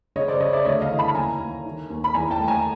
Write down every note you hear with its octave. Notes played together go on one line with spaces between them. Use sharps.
C#3 C#5 D#5
C5 D5
C#3 C#5 D#5
D5 E5
D2 C#5 D#5
D#5 F5
E3
A5 B5
D#2 G#5 A#5
D#2
D#3
D#2
B5
E2 G#5 A#5
G5 A5
A3
G#5 A#5